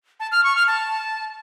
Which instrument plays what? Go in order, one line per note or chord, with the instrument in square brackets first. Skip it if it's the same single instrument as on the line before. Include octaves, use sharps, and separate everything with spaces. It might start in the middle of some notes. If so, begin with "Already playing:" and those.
[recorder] A5
F6
C#6
F6
A5